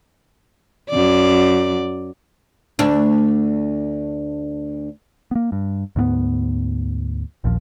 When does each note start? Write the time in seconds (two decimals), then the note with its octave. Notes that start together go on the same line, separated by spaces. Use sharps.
0.90 F#2 D5
2.79 D2 D4
5.31 A#3 B3
5.52 G2
5.96 D2 G#2 A#3 B3
7.44 A#1 D#2 A#2 F3